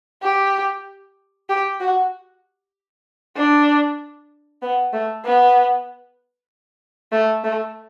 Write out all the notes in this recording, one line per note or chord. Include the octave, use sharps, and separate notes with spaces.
G4
G4
F#4
D4
B3
A3
B3
A3
A3